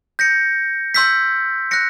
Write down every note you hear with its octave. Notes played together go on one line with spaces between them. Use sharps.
G6 A#6 C#7
C6 E6 G6 B6
F#6 A#6 C#7